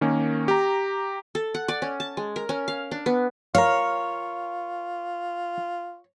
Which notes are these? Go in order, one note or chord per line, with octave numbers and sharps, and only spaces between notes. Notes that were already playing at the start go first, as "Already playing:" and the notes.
D#3 A#3 C#4
G4 A#5
A4
F#5
D5
C#4
A5
G#3
A#4
C#4
F5
D4
B3
F4 A#4 C#5 F5